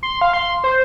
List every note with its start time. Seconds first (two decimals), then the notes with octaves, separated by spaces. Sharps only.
0.03 C6
0.21 F5
0.33 C6
0.64 C5